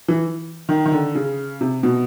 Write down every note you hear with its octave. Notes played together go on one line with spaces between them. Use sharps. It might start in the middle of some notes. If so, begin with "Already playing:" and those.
E3
D#3
D#3
D3
C#3
C3
B2